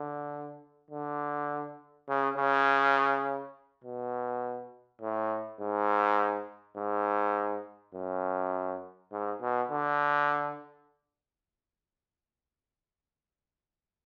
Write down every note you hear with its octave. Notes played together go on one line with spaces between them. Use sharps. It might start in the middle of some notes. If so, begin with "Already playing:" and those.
Already playing: D3
D3
C#3
C#3
B2
A2
G#2
G#2
F#2
G#2
B2
D3